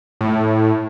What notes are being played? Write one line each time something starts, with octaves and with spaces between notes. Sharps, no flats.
A2